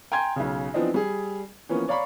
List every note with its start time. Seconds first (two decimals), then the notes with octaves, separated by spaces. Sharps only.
0.12 G5 G#5 A#5 C6 G#6
0.36 B1 C#3
0.74 E3 F3 B3 C4 D4 D#4
0.94 G3 G#4
1.69 E3 F3 A#3 B3 C#4
1.88 C#5 D5 F5 A#5 B5 C#6